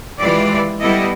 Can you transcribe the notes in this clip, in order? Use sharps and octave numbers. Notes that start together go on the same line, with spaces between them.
E3 G#3 F4 G4 D5
G3 B3 E4 A4 D#5